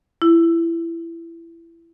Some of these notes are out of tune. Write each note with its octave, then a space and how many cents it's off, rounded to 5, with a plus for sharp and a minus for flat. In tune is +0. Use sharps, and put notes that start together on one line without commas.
E4 +20